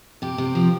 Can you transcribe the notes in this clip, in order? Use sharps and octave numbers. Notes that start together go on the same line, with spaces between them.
C3 G4
C3
F3